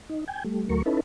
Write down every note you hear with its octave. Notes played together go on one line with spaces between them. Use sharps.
D#4
G5 G#5
G3 A3
D2 F#3 A3 A#4 C#6
C#4 D#4 E4 A4 B4